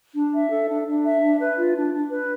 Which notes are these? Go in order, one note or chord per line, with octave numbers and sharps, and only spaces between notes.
D4
E5
A4
D4
D4
E5
D4
B4
F4
D4
D4
B4